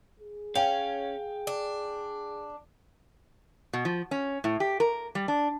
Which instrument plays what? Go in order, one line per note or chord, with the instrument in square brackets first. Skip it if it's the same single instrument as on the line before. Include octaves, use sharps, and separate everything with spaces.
[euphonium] G#4
[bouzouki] C#4 [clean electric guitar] F5 [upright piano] G5
[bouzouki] D4
[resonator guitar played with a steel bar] B2
F3
C#4
A2
G4
A#4
G3
D4